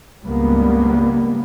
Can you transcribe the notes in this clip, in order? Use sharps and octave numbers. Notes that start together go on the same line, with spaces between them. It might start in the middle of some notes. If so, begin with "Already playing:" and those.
C#2 G2 G3 A#3 B3